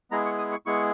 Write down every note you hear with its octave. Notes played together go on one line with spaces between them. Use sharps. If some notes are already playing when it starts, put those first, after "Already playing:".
G#3 B3 E4 G#4 A#5
C#6
D#6
C#6
G#3 B3 E4 G#4 C#6